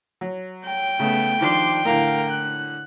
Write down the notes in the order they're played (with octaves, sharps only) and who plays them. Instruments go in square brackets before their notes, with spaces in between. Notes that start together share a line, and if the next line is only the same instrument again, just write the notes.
[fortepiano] F#3
[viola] G5
[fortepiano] C#3 [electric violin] A3 B3
[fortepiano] D#3 F3 D4 [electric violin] C6 D6
[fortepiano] A2 D3 [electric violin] A#4 F5
[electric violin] F#6